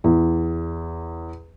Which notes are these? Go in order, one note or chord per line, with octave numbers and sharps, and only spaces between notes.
E2